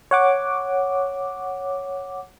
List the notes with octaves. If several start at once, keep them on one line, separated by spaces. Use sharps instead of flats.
C#5 F#5 D6